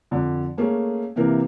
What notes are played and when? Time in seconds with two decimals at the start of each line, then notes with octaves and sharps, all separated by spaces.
0.11 F2 D3
0.57 A3 A#3 C#4 G#4
1.16 C3 E3 A#3 A#4